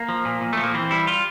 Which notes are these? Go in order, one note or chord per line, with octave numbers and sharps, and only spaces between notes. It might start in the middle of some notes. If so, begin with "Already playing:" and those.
Already playing: A#3
F3
A#2
A#2
F3 A3
A#3
E3 C4
G3 E4
F4